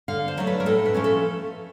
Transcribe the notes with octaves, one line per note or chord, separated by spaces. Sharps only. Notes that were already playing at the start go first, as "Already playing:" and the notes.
D3 F5
C5
F#3 A3 D4
B4
A#4
A2 A4
B4
F3 A3 C#4
A4